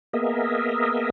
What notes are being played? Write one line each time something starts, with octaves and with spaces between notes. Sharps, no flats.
A#3 B3 G#4 A#4 D#5 E5